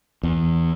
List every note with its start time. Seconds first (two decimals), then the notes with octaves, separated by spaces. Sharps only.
0.23 E2